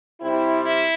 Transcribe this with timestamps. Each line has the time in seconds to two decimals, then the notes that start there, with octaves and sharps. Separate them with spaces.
0.20 C3 G3 C4 E4
0.64 E4